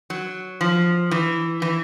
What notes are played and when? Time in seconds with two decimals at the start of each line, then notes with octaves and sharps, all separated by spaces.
0.10 F#3
0.61 F3
1.11 E3
1.62 E3